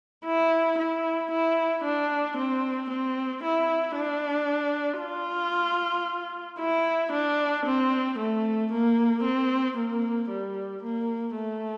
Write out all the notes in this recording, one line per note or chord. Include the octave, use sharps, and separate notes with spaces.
E4
E4
E4
D4
C4
C4
E4
D4
F4
E4
D4
C4
A3
A#3
C4
A#3
G3
A#3
A3